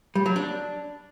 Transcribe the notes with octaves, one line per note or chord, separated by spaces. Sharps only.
G3
F#3
D4